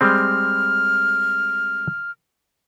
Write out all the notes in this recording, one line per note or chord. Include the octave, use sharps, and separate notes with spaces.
G3 G#3 C4 F6